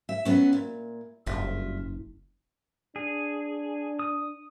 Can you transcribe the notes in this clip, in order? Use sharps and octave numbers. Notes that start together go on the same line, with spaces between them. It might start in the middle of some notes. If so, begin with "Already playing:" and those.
E5
F#3 B3 C#4
A#2
F#1 G2 F4 E5
D4 G#4
D#6